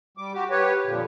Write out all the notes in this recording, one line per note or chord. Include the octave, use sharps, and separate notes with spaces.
G3 D6
F#4 G4
G4 B4 C#5
F2 A#2 D3 F3